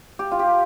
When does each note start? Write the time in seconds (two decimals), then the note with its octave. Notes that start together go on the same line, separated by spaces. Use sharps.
0.19 G4
0.31 F4
0.39 G4